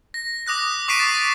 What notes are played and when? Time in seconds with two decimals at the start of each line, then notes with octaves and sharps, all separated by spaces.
0.14 A#6
0.47 D6 D#6 F#6 A#6
0.88 C#6 D6 B6 C7 D7 D#7
1.00 A6
1.15 A6